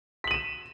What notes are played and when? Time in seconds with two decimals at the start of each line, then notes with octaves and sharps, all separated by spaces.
0.24 B6
0.27 F#7
0.31 D#7
0.34 E7